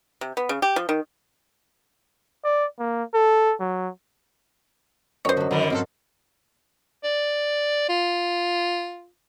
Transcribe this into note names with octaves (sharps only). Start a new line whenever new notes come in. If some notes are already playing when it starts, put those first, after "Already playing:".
C3
B3
C#3
G4
F3
D#3
D5
A#3
A4
F#3
F#2 C5 C#5 D#5
D3 F#3
D3 D#3 F#3 A#5
G#2 B2 F3 C4 E4 A4
D5
F4